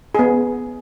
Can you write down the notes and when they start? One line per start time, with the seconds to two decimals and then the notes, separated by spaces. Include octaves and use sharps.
0.15 B3 G#4